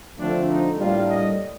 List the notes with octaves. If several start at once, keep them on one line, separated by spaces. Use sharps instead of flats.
D3 F3 A3 C4 D4
D#4
A2 G3 A#3 D4 F4
D#5